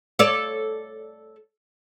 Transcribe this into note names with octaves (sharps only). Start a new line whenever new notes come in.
A4 C#5 D5